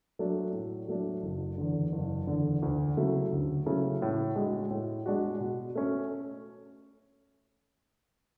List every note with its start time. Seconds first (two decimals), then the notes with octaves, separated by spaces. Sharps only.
0.19 F#3 A3 D4
0.53 A2
0.88 F#3 A3 D4
1.23 F#1
1.58 E2 D3
1.92 F#1
2.27 E2 D3
2.62 D2
2.97 C#3 F#3 A3 E4
3.32 D2
3.66 C#3 F#3 A3 E4
4.02 A2
4.36 G#3 D4 F#4
4.71 A2
5.06 G#3 D4 F#4
5.40 B2
5.75 A3 C#4